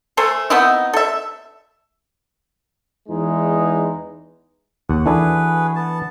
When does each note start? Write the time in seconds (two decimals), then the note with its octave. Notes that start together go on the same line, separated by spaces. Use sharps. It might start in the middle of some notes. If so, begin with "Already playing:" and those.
0.17 A3 A4 C5 G#5
0.50 B3 C4 D#4 E4
0.93 A4 E5
3.09 E2 E3 G#3 D#4
4.89 D#2 F#5
5.06 E3 D4 F#4 G#4 A4 B4
5.76 B3 A5